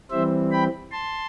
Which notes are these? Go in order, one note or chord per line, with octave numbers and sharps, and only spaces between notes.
E3 G3 C4 C5 E5
G5 B5
A5 C6